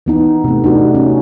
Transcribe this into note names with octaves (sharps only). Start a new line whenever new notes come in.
E3 B3 D#4
C3 A3
D4 D#4 F#4
C#4